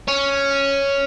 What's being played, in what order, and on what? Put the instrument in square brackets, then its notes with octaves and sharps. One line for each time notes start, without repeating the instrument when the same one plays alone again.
[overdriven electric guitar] C#4